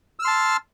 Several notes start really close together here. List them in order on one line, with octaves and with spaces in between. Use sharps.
E6 F6 C6 A5